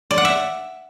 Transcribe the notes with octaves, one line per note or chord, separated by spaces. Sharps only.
D5
F#5
E5